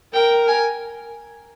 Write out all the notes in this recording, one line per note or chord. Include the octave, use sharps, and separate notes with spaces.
A#4 G5
G#5